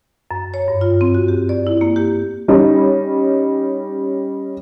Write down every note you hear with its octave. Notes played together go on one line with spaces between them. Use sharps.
F#2
C#5
G2
F4
C4
F#4
G4
D5
E4
A#3
G4
G3 C#4 D#4